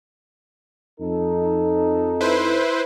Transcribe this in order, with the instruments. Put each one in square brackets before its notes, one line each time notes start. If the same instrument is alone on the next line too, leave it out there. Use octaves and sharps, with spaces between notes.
[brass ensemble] F2 D#4 A4
[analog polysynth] E4 B4 C5